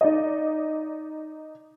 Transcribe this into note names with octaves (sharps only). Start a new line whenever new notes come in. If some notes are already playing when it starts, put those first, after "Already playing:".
D#4 D5 D#5